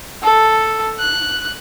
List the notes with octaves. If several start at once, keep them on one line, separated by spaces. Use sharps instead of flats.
A4
F#6